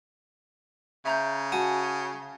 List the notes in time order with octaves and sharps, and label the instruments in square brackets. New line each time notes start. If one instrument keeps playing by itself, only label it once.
[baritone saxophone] C#3 [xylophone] E5 A#5 G6
[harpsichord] F#4 [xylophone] G#5 A5